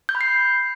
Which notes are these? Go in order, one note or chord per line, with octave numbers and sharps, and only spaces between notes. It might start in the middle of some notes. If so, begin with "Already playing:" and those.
G6
B5
C7